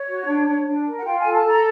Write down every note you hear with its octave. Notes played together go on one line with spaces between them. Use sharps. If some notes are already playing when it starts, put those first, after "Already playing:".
Already playing: C#5
F#4
D4
D4
D4
A#4
F#5
F4 G5
G#5
A4
A5
A4 A#5